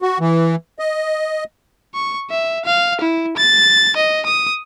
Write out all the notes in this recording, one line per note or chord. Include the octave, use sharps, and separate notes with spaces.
F#4
E3
D#5
C#6
E5
F5
E4
A6
D#5
D#6